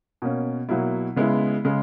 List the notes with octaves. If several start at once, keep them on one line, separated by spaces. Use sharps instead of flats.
B2 A#3 C#4
B2 F#3 A#3 E4
C#3 G#3 B3 E4
C#3 G#3